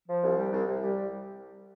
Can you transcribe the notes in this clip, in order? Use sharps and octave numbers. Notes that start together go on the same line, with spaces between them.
F3
C2
G3
C2
C2
G3